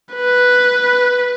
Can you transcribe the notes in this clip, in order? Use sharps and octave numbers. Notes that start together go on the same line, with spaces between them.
B4